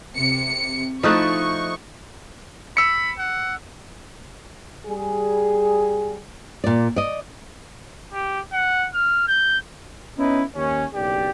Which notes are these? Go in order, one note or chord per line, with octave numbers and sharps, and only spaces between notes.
C3 C#7
F3 A3 D#4 E4 C#6 D#6 F#6
B5 E6 C#7
F#5
G3 G#4
A#2 D5
D5 D#5
G4
F#5
F6
G6
B3 C#4 D#4 E4 B4
D#2 C#4
F#1 B1 G4 D5